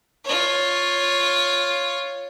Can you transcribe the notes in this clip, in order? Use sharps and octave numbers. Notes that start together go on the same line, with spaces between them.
F4 C#5